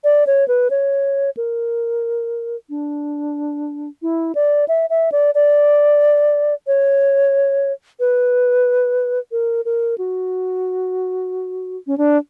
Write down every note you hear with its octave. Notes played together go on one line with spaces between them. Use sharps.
D5
C#5
B4
C#5
A#4
D4
E4
D5
E5
E5
D5
D5
C#5
B4
A#4
A#4
F#4
C#4
D4